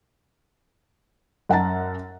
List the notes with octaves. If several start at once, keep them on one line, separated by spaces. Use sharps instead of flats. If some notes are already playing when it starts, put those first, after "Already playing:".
F#2 F#5 A5 A#5 A6